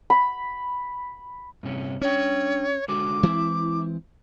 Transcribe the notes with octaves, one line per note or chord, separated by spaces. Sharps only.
B5
G2 C3 C#4
C#4 D4 C#5 G5
D3 G#3 F#4 D6
E3 G#3 C4 E4